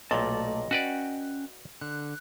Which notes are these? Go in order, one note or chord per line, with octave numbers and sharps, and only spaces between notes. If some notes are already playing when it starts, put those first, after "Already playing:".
B1 A#2 A3 D5 D#5 A5
C#4 F#4 B4 D5 F#5 G5
D3 F#6